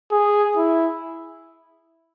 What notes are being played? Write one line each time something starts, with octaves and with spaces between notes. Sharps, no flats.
G#4
E4